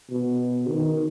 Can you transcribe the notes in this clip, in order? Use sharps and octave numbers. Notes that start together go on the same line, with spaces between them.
B2
D#3